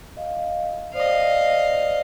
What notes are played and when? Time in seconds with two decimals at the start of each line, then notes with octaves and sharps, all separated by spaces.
0.17 D#5 F5
0.94 C5 D5 D#5 F5